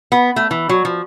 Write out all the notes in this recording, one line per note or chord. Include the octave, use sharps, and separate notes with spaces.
B3
A3
E3
F#3
F3